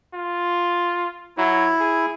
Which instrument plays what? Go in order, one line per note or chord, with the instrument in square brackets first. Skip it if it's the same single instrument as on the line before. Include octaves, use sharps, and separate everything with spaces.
[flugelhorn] F4
[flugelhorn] F#3 [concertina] E4
[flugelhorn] G#4